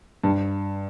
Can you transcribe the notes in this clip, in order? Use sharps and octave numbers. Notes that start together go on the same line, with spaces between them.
G2